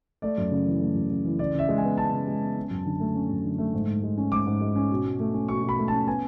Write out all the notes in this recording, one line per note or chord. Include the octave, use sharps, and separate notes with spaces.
A3 D5
F#2
C#3
E3
A3
F#2
C#3
E3
C#3 D5
C#3 E5
G#3
G#5
B3
C#3 A5
C#3
G#3
B3
C#4
F#2
D3
A3
C#4
F#2
D3
A3
G#2
G#2
G#3
C#4
G#2 D6
G#2
G#3
C#4
B2
B2
A3
C#4
B2 C#6
B2
B5
A3
C#4 A5
B3 G#5